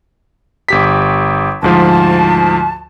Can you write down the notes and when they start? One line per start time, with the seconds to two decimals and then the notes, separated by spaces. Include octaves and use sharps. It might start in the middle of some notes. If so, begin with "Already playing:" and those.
0.69 G1 G4 B6
1.62 D2 G#2 F3 A5